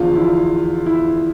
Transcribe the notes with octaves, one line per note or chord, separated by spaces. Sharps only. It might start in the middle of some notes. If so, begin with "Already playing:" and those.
Already playing: E2 D3 F3 F4
E4
E4